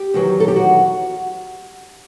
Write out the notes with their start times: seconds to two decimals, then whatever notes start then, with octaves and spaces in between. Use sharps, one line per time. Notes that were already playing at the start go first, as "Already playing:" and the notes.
Already playing: G4
0.14 E2 D#3 F#3
0.40 A4
0.48 G4
0.56 F#4